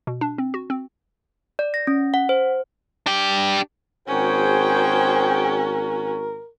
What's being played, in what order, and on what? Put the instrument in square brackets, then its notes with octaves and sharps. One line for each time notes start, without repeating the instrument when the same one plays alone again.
[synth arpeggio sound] B2
D4
C4
F#4
C4
[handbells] D5
A#6
C#4
F#5
C5
[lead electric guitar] D4 G4
[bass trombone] G#1 [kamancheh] C#4 F#4 [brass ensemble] G#4 C5 G5 [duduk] A#4